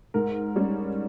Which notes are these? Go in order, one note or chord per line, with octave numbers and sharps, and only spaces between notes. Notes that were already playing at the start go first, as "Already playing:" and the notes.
G#2 A#4
G3 C#4